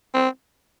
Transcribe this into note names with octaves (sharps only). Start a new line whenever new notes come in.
C4